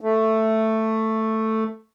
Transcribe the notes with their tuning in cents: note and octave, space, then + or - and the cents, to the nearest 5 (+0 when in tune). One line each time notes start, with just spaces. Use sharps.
A3 +5